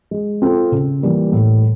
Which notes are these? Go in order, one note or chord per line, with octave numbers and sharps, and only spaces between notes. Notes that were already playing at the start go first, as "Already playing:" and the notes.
G#3
C4 F4 A4
C#3
E3 G3 A#3
A2